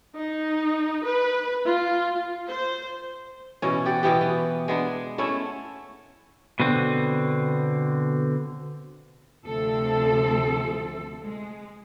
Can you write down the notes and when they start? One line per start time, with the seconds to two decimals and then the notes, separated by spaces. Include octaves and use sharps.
0.16 D#4
1.04 B4
1.66 F4
2.49 C5
3.62 B2 E3 C#4
3.85 G4 D5 F#5
4.03 B2 E3 B3 G4
4.21 B3
4.68 G#3 B3 D4
5.18 A3 C#4 E4
6.60 B2 D3 C4
9.45 D2 C3 F3 C4 A4
11.23 G#3